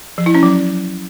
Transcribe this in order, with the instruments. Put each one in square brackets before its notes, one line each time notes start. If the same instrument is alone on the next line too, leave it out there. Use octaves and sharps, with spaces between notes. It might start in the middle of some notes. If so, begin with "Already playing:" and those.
[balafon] F3
E4
C#4
F#3